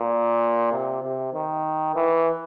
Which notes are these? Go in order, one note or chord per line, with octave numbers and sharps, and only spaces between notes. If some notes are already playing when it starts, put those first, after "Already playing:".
Already playing: A#2
C3
C3
D#3
E3